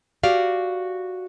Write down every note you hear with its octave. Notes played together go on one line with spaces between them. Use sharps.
F#4 G4 D5 F5